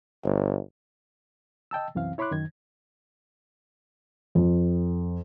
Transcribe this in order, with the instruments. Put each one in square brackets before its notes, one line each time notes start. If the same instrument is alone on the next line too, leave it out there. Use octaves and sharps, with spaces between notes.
[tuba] G1
[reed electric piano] D#5 G5 A5 E6
C2 F#2 E3 C4 F5
E4 C#5 B5 C6 D6 F#6
F#2 D#3 G#6
[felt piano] F2